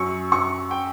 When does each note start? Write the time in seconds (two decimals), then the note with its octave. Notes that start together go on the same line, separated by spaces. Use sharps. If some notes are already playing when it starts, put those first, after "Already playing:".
Already playing: F#2 F#3 C#6
0.32 F#2 C#6
0.71 G5